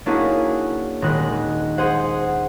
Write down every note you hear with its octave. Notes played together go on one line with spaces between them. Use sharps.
A#3 C#4 D4 E4 F#4 G#4
D#1 G#3 F#6
G#4 C5 F#5